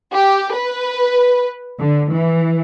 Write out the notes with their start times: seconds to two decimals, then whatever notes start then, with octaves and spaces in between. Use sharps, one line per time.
0.11 G4
0.54 B4
1.81 D3
2.11 E3